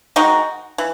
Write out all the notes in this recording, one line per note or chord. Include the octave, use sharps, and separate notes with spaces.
D#3 G#3 D#4 F#4
E3